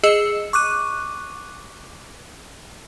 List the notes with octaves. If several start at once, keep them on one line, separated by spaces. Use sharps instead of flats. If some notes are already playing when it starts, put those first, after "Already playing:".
G#4 D#5 E6 C#7 E7
C#6 D6 F#6 D#7